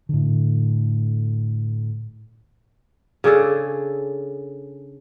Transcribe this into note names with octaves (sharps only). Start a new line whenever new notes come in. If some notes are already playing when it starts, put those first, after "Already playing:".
A2 D3
C#3 D4 G#4 A4